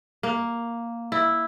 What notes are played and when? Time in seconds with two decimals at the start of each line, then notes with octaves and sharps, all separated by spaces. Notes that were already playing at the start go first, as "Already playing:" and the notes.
0.23 A#3
1.12 E4